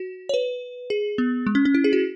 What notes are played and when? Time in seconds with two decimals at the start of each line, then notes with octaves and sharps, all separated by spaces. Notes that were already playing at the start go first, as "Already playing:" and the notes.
Already playing: F#4
0.29 C#5
0.34 B4
0.90 G#4
1.18 B3
1.47 G#3
1.55 C#4
1.65 C#4
1.75 E4
1.84 G#4
1.93 F#4